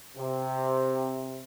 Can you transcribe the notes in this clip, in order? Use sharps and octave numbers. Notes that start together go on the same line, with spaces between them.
C3